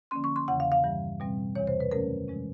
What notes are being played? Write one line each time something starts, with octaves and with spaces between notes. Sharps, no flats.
D3 F3 A#3 C#4 C6
C#6
C6
E2 C#3 E3 F#5
F5
F5
G2 E3 G3
B2 G3 C4
E2 C3 E3 C#5
C5
B4
F#2 D#3 F#3 A3 C#4 A#4
C3 F3 G#3 C#4